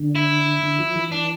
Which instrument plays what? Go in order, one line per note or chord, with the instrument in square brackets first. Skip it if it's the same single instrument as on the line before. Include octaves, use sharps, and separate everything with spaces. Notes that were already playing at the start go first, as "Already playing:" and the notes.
Already playing: [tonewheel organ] D3
[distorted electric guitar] E4
[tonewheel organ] D3
F3
E3
[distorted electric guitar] D4